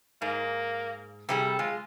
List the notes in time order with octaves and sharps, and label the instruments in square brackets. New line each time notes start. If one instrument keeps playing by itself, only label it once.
[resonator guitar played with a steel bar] G#2 [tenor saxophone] A#3
[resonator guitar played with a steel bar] C3 G3 G#4 [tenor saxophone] A4
[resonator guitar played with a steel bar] G#3 [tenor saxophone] F4